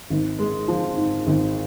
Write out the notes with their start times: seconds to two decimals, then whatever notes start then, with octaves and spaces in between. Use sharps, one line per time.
0.10 G#1
0.39 G#3
0.68 F3
0.97 G#2
1.27 G#1